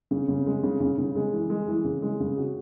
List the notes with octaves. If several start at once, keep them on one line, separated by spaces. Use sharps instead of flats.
C#3
C#3
G#3
C#3
C#3
C#3
G#3
E3
G#3
E3
C#3
G#3
C#3
F#4